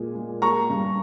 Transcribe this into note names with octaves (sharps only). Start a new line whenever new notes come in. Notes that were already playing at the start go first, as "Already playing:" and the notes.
Already playing: A#2 G#3
G#3
A#3 A#5 C#6
G2